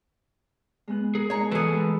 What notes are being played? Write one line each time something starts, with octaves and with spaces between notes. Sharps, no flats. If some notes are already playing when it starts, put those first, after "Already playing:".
G#3 B3 F#6
G#4 A#4
B2 G#3 D#4 C#5 A#5
E3 F#4 G#4 A4 B4
G#3 A3 B5